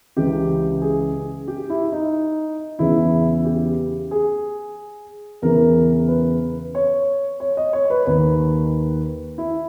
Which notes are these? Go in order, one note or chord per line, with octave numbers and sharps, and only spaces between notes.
C#2 C#3 E3 G4
G#4
G4
E4
D#4
E2 C#3 E3 E4
G4
G#4
E2 C#3 E3 A#4
B4
C#5
C#5
D#5
C#5
B4
D#2 D#3 B4
E4